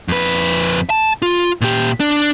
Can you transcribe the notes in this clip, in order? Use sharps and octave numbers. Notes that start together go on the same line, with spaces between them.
F2 B4
A5
F4
A#2 G4
D4